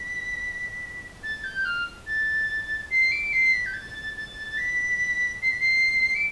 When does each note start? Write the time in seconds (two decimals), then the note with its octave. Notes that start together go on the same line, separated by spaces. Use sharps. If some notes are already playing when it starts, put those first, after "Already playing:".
Already playing: B6
1.23 A6
1.44 G6
1.65 F6
2.07 A6
2.91 C7
3.12 D7
3.33 C7
3.53 B6
3.66 G6
3.74 A6
4.17 A6
4.57 B6
5.42 C7
5.51 B6
5.60 C7
6.15 D7